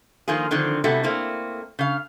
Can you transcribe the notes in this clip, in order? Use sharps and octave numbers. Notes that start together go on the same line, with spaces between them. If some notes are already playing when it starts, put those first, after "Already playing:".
D#3 F3 A#3 F4 G#4
D3 D#3 F3 C4
C3 G3 A3 B3 E4 F#4
A3 A#3 C4 E4
C#3 F5